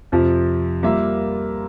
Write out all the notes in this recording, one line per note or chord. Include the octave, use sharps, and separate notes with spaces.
F2 C3 F3
G3 A#3 F4 A#4 E5